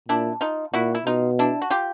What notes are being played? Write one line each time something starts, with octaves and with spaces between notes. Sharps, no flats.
A#2 D4 E4
D#4 F4
A#2 E4 F#4
E4
B2 D#4 F4
D4 E4
F#4
F4 G4